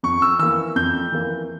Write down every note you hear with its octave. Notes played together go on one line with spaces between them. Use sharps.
F2 C#6
E6
E3 A#3 E6
F2 G6
E3 A#3